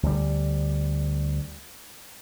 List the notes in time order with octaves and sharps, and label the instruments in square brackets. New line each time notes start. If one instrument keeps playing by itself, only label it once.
[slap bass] D2 G3